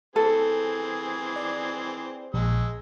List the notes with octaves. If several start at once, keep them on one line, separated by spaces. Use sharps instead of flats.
E3 C4 G#4 A4
D5
A#1 G#3 E6